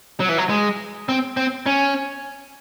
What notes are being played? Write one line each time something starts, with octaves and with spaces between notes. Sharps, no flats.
F#3
E3
F#3
G#3
C4
C4
C#4